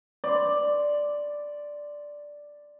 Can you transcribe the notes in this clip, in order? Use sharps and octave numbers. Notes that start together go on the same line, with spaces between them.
D5 C6